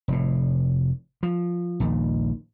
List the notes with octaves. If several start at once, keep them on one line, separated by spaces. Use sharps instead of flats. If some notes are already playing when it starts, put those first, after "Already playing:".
F1 A2
F3
A#1 D#2 A#2